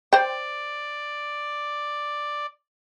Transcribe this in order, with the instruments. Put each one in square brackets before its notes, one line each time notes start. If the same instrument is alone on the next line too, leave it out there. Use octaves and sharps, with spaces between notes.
[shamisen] C5 G5 [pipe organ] D5